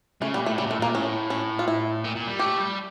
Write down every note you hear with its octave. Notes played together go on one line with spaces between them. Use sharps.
C#3 A3
A#2 G3
A2 A3
C#3 G3
A#2
A2 A3
A#2 A#3
A2 C#4
C#4
F4
E4
A#2
A#2
G3
A3 G4
G3